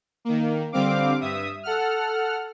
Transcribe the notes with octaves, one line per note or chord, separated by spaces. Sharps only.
D#3 A#3
D3 G3 C4 F5 D6
G2 E5 D#6
A4 F#5 F6